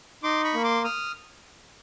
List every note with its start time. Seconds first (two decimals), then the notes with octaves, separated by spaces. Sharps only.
0.23 D#4 C6 D6
0.44 B5 C#6
0.54 A#3
0.64 C6 D6
0.84 D#6 F6